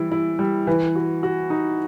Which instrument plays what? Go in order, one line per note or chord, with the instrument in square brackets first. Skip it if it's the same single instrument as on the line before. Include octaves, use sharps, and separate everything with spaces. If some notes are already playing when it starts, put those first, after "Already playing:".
Already playing: [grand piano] E3 [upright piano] G3 E4
[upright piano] E4
G3
[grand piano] E3 [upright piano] B4
[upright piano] F#4
F#4
D#4